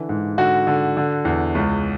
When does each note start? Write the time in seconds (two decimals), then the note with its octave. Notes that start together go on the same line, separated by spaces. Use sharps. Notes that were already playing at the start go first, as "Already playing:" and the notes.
Already playing: D3 E3
0.09 G#2
0.38 D3 F#4
0.67 D3
0.97 D3
1.25 E2
1.55 C#2